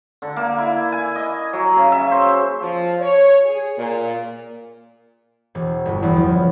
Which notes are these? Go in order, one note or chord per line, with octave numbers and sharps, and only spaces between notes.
D3
A#3
E4
G#5
D#5
F#3
C#3
E5
C5
F3
C#5
G#4
A#2
E1
G1
E2
F3
C#3